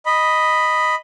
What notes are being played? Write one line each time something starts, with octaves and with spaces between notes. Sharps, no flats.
D#5 B5